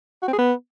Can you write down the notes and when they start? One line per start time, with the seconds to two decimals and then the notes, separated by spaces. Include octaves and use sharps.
0.23 F#4
0.28 C4
0.33 G#4
0.38 B3